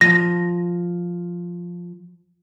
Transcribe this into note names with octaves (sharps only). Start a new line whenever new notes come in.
F3 A#6